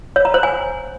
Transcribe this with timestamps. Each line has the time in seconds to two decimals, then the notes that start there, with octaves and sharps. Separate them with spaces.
0.16 C#5
0.25 A#5
0.34 C5
0.43 G#5